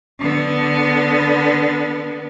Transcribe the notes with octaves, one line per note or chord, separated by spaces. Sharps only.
D3 B3